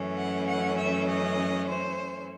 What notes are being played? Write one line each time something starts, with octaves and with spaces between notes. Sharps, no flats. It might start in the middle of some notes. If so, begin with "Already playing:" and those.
Already playing: F#2 E3 A3 C#4
F#5
F#5
E5
D#5
C5